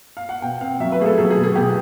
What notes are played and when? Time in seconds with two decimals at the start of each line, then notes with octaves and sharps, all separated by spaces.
0.17 F5
0.29 F#5
0.42 B2 G5
0.61 C4 F5
0.80 F#3 E5
0.92 B4
0.99 A3 G#4
1.06 A4
1.18 F#3 G#4
1.30 G#4
1.37 B2
1.44 G#4
1.55 B2 G4